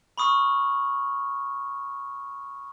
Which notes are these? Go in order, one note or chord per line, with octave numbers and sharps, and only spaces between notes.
B5 C#6 D#6 F6